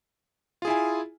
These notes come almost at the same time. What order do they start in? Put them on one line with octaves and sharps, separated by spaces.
F4 G#4 E4 G#5